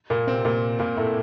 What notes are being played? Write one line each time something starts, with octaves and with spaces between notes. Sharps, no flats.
A#2 A#3
C3 C4
A#2 A#3
A#2 A#3
A2 A3